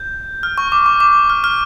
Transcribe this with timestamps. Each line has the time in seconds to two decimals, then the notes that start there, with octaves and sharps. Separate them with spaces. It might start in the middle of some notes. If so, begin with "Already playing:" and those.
Already playing: G6
0.43 F6
0.58 C#6
0.72 D6
0.86 C#6
1.00 D6
1.30 F6
1.44 F6